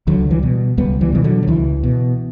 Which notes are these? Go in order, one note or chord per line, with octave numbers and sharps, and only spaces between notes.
C#2 D3 F#3
E3 G3
B2
C#2 G3 B3
E3 G3
B2 E3
D3 F#3
F#3
C#2 E3
B2